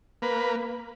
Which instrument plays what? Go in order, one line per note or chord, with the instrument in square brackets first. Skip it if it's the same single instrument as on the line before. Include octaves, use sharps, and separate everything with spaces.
[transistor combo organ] A#3 B4